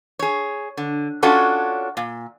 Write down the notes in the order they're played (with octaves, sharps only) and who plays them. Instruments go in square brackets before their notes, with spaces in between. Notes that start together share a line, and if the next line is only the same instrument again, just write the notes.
[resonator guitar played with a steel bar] G#4 C#5
D3
C#4 D4 F4 F#4 A4 C#5
A#2